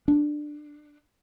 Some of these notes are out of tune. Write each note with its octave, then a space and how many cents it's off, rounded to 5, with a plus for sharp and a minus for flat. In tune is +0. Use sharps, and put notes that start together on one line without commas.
D4 +15